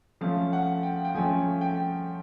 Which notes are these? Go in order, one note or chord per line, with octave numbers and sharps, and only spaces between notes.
F3 A3 C#4 F5
F#5
G5
G5
F3 A3 C#4 G#5
G5